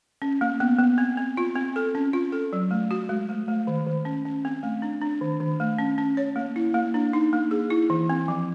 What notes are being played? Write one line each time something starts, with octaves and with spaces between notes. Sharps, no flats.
C#4
A#3
B3
B3
C4
C4
F4
C4
A4
C#4
F4
A4
F#3
A3
F#4
G#3
A3
A3
D#3
D#3
C#4
C#4
C4
A3
D4
D4
D#3
D#3
A3
C#4
C#4
C#5
A#3
E4
A#3
D4
D#4
A#3
G#4
E4
E3
C4
F3